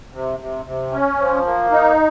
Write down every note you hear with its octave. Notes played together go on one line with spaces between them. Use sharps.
C3
C3
C3
C#4
F3
A#3
D#4